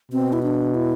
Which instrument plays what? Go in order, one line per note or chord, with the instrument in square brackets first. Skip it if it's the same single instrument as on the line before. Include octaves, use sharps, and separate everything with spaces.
[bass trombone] B2 [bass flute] C4
[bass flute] E4
D4
E4